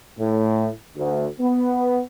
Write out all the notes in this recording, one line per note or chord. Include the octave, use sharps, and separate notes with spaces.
A2
D2
B3